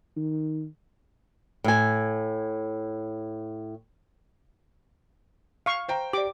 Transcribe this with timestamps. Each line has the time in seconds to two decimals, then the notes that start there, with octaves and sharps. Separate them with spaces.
0.16 D#3
1.64 A2 G#5
5.66 F5 C#6
5.88 C5 G5 A#5
6.13 G4 D5 D6